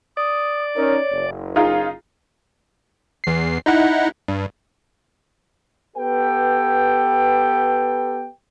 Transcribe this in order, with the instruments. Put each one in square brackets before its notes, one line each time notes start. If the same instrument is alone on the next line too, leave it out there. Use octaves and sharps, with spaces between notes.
[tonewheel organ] D5 [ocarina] D#6
[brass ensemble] C#4 D#4 A#4 [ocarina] C#5
[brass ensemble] F#1
[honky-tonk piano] D#4 F4 G#4 [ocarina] F5
[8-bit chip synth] E2 C7
D#4 E4 F#5
G2
[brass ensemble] B3 G4 A4 B4 G5